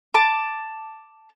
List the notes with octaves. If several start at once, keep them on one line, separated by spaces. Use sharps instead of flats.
A5 D6